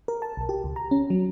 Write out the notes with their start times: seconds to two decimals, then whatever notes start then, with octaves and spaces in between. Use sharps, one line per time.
0.08 A#4
0.22 A5
0.37 B1
0.49 G4
0.64 C#2
0.76 A#5
0.91 C#4
1.10 F#3